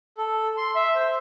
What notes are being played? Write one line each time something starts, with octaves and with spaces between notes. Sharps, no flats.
A4
C6
E5
C5